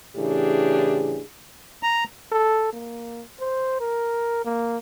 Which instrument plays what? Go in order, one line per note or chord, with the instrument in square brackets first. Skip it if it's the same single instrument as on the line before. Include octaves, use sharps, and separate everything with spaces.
[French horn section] A2 C#3 E3 D4 G4 G#4
[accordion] A#5
[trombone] A4
A#3
C5
A#4
A#3